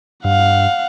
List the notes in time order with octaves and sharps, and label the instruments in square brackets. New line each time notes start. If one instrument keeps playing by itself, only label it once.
[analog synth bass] G2 [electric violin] F5 F#5